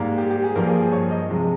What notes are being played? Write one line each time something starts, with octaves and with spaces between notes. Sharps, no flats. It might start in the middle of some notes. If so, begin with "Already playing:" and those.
Already playing: G#2 G3 A#3
G4
G4
G#4
G2 F3 A#3 A#4
G#4
G#4
C#5
D#5
C3 F3 G#3